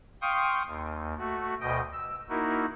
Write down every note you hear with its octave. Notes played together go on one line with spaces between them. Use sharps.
F5 G5 C6 C#6 D#6
D#2
A3 F#4
D2 B2 D#5 G5
E6
A#3 D#4 E4 F#4 A#4